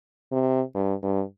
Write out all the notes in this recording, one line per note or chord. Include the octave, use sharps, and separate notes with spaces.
C3
G2
G2